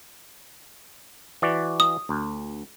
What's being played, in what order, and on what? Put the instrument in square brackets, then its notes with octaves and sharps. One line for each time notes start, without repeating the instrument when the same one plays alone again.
[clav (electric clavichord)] E3 F#4 D5
[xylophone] D#6
[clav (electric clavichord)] D2